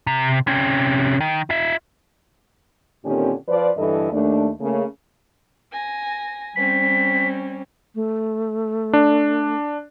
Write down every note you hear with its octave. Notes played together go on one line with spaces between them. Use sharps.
C3
C3 C#4
D#3
F4 E5
A#2 D3 D#3 C4 C#4 G4
F3 F4 B4 C5 D5
G2 D3 E3 E4 A4 D#5
D#2 A3 D4
C#3 A3 A#3
G#5 A#6
G3 C4 C#4 B6
A3
D4